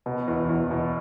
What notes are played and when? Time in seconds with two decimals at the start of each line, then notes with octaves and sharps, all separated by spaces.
0.06 B2
0.28 E2
0.49 E2
0.71 B2